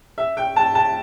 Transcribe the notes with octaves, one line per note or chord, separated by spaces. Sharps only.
E5
G5
A5
A5